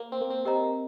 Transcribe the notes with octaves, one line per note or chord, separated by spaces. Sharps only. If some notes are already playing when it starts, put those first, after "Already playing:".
Already playing: A#3
C4
A#3
C4
C4 G4 A#4 D#5 A#5